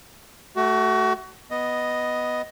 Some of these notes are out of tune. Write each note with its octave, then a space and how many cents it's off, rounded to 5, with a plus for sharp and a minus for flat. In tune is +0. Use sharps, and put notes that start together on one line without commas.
A3 +0 F#4 +30
B3 +0 D#5 +0